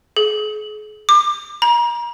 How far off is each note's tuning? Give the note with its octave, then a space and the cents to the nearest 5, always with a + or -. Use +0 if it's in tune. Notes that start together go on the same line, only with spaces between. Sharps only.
G#4 +40
D6 +30
A#5 +35